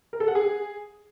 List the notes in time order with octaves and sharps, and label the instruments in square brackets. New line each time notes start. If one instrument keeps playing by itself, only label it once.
[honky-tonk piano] A#4
A4
F#5
G#4